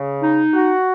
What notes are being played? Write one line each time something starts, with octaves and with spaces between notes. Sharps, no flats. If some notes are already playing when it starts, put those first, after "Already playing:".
Already playing: C#3
D#4
F#4